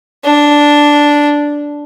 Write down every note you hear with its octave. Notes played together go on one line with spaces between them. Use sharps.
D4